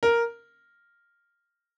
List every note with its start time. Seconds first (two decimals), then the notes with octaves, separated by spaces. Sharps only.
0.03 A#4